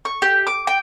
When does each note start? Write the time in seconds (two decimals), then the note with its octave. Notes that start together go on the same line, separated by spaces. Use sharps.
0.05 C#6
0.22 G4
0.47 D6
0.67 G5